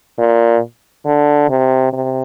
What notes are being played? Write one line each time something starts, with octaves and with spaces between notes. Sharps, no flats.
A#2
D3
C3
C3